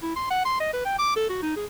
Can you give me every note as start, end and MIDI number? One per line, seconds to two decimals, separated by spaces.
0.02 0.15 64
0.16 0.30 84
0.31 0.44 78
0.45 0.55 84
0.60 0.69 75
0.73 0.84 71
0.85 0.98 79
0.99 1.14 86
1.16 1.27 69
1.30 1.41 66
1.42 1.53 63
1.56 1.65 68